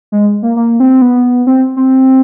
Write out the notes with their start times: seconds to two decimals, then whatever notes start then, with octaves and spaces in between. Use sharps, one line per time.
0.12 G#3
0.43 A#3
0.56 A#3
0.80 C4
1.02 B3
1.47 C4
1.77 C4